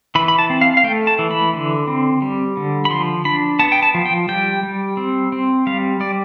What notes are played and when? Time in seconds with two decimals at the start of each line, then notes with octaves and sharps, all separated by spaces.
0.15 E3 B5
0.28 B5
0.39 A5
0.50 C4
0.61 F5
0.77 F5
0.84 A3 G5
1.07 A5
1.19 E3
1.31 B5
1.54 D3
1.88 C4
2.22 G3
2.57 D3
2.85 B5
2.90 F3 C6
3.25 D4 B5
3.59 B3 A5
3.72 G5
3.83 A5
3.94 F3
4.06 G5
4.29 G3 G5
4.63 G3
4.97 C4
5.32 C4
5.67 G3 F5
6.00 G3 D5